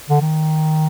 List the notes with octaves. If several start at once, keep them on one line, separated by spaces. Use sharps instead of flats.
D3
D#3